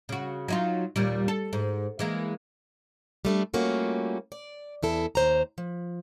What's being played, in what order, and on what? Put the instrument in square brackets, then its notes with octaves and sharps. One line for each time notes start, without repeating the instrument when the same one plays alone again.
[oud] C#3 F#4
F#3 D#4 F4
D#2 A#2 G3
A4
G#2
E3 G#3 A#3
[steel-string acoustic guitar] G3 A3 D4
G3 A3 A#3 C#4 F4 F#4
D5
E2 E4 A4
D#2 C5 A#5
F3